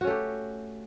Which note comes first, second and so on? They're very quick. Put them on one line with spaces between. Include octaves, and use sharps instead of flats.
F#4 C#4 A3 G4